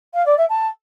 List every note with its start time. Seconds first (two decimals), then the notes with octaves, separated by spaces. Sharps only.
0.13 F5
0.25 D5
0.37 E5
0.49 A5